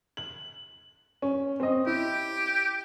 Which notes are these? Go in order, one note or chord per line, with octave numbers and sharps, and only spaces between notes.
F#7
C#4
C4 D#5
E4 G4